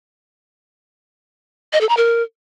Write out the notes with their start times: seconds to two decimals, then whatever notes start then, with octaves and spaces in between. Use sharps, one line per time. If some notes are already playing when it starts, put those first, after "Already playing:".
1.73 D#5
1.81 A4
1.89 A#5
1.97 A#4